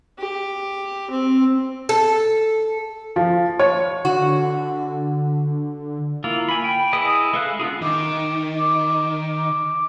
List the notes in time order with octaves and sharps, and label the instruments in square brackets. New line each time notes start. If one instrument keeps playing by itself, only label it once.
[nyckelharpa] G4
C4
[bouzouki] A4
[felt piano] F3
C#5
[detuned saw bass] D3 [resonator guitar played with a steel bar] F#4
[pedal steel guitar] A#3 E4 F4
G#5 B5
G5
E4 G#4 B4 D#5
G#3 A4 E5 F5 F#6
B3 D4 F4 G#4
[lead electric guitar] D#3 [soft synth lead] D6
[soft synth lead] D6